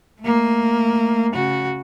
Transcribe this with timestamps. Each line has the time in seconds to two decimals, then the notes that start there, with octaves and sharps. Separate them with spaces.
0.21 A3 A#3
1.33 C#3 F#4